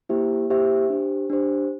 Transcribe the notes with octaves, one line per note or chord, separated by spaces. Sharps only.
A#3 E4 G4 C5 E5
A#3 E4 G4 C5 E5
D4 G4 C5
D4 G4 C5